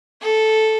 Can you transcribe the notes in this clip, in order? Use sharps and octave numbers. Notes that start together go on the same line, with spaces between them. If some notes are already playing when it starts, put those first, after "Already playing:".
A4